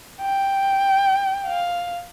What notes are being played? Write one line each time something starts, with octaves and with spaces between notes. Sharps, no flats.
G5
F5